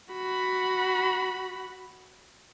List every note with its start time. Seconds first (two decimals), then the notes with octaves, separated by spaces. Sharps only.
0.13 F#4 B5